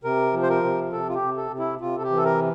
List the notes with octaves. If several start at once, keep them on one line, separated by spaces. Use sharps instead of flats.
C3 A#4
F3
C5
A#4
C3
C3 A4
F4
G4
C3
A4
C3
E4
C3 F4
A4
G4
E3
A4
A#4